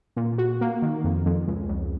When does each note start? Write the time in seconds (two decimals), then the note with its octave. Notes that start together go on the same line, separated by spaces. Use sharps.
0.16 A#2
0.38 F#4
0.61 A#3
0.82 D#3
1.04 F2
1.26 F2
1.47 C#2
1.68 C#2